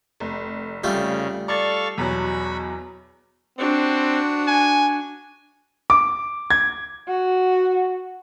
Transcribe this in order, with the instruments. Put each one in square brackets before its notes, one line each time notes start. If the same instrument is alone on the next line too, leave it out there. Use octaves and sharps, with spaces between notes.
[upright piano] F1
[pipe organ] C#3 [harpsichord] G3 A3 F4
[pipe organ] A4 F5 C#6 [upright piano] D5 A6
[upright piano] E2 B2 F#3 [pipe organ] F#4 B5
[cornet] C4 [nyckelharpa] D4 F#4
[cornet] G#5
[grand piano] D6
G#6
[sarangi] F#4